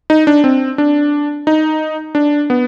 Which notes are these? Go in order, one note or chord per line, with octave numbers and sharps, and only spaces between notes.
D#4
D4
C4
D4
D#4
D4
B3